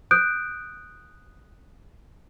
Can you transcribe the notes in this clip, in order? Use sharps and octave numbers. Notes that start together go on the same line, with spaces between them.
D#6 F#6 G6 D7